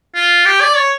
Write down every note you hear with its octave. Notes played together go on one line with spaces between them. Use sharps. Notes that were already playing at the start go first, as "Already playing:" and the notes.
F4
G4
D5
C#5